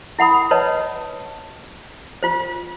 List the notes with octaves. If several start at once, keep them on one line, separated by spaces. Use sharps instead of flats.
E4 F#5 B5 D#6
B4 C#5 D#5 A5
F4 C5